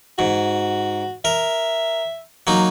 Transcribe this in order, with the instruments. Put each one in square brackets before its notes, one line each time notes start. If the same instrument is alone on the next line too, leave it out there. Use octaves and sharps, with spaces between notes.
[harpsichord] G#2 [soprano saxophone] F#4
[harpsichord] A#4 [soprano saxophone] E5
[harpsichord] F#3 A#3 D#4